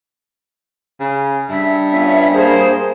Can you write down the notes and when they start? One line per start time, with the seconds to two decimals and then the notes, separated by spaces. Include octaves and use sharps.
1.00 C#3
1.50 G2 E5
1.92 B3 C#4 F4
2.34 A#3 G#4 C5